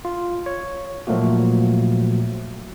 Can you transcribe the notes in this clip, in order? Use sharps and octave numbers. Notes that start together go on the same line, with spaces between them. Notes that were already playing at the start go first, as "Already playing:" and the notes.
F4
C#5
A#2 F3 F#3 A3 A#3 F#4